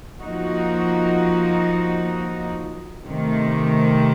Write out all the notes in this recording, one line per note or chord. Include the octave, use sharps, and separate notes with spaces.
F3 A#3 D#4 F#4
C3 D#3 A3